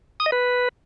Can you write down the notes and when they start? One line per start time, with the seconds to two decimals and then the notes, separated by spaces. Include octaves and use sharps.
0.20 D#6
0.26 D#5
0.32 B4